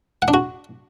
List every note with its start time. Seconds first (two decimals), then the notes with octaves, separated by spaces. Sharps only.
0.22 F#5
0.28 D4
0.34 F#4